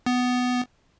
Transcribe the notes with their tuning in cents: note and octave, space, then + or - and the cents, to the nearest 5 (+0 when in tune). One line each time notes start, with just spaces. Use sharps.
B3 +10